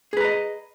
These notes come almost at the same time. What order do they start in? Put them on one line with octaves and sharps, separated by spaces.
G#4 B4 A#5 D#5